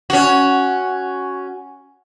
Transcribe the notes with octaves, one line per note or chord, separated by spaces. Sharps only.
C#4 F#4